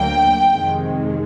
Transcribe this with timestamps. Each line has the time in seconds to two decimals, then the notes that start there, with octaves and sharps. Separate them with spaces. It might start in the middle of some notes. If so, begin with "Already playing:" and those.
Already playing: D2 D3 F#3 A#3 G5
0.51 F2 C3 D#3 G#3